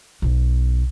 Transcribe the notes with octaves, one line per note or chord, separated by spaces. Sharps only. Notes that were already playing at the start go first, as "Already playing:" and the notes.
B1 B2